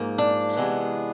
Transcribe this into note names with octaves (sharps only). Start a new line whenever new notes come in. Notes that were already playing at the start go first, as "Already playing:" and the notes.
Already playing: G#2 F3 A#3
D4
C3 E3 G#3 B3